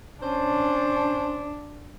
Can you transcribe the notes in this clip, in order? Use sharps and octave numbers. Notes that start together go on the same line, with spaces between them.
C#4 D4 C5 A5